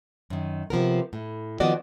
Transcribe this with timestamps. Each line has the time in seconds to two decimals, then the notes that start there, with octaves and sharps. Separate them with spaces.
0.30 F#2 D#3
0.70 C3 F3 B3 A#4
1.13 A2
1.60 D#3 F3 B3 F#4 D5 D#5